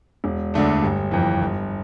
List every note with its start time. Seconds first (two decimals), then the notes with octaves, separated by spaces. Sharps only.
0.24 E1
0.54 D2 D3 A3 D4
0.83 G1
1.11 F2 E3
1.41 G1